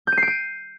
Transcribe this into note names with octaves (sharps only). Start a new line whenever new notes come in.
G6
D#7
C7
D7
D#7